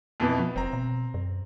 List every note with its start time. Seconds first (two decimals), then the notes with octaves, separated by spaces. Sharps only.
0.20 F2 B2 E3
0.39 F3 B3
0.56 F1 C4 A#5
0.73 B2
1.14 F#2